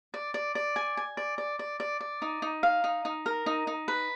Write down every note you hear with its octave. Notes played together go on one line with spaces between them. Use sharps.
D5
D5
D5
G#5
G#5
D5
D5
D5
D5
D5
D#4
D#4
F5
D#4
D#4
A#4
D#4
D#4
B4